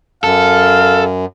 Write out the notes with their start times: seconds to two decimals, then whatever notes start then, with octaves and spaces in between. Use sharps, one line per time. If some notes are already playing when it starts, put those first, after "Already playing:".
0.24 F#2 A4 F5